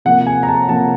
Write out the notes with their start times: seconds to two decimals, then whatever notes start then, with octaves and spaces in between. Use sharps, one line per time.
0.05 C3 F3 A#3 F#5
0.27 G#5
0.43 A#5
0.48 A5
0.69 C3 F3 A#3 A5